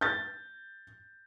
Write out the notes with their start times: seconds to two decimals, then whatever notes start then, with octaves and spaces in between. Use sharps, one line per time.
0.01 G6 A6